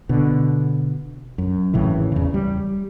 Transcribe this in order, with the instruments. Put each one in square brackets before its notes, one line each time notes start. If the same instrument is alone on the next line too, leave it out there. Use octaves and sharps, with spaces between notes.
[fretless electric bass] B2 D3
F#2
G#1 A2 C#3 E3
E2 C#3
G3